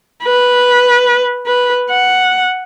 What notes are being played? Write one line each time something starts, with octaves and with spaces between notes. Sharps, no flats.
B4
B4
F#5